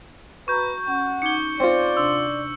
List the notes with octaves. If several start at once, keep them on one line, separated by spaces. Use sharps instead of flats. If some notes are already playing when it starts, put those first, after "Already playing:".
F#4 B4 A#5 C#6 G6
C#4 F#5
D#4 D6 G#6 C#7 G7
C4 F4 D5
C3 D4 C6 E6